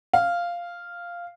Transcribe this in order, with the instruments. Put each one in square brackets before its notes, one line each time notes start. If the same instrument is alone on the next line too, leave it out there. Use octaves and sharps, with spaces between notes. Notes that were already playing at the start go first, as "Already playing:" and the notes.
[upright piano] F5